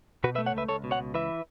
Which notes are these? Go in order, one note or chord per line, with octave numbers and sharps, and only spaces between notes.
B2 F#4 B4
B4 E5
A3
C#5 F#5
C#2 B4 E5
C#2 A4 C#5
B2
C#5 F#5
C#2
E3 B4 E5